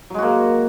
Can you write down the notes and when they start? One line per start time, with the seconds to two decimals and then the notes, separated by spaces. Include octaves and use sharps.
0.10 F#3
0.14 G#3
0.18 F#4
0.23 A#3